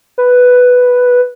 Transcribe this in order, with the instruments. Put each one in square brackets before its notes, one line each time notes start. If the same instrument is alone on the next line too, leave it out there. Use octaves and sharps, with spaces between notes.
[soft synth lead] B4